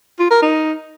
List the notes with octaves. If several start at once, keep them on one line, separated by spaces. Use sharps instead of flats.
F4
A#4
D#4